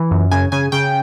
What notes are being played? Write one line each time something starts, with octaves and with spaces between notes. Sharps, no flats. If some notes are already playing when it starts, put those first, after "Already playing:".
Already playing: E3
F#2
C#3 G#5
C#3 G#5
C#3 G5